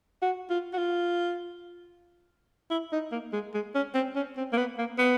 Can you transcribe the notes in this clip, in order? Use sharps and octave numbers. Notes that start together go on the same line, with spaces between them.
F#4
F4
F#4
F4
E4
D#4
A#3
G#3
G#3
C#4
C4
C#4
C4
A#3
B3
A#3
B3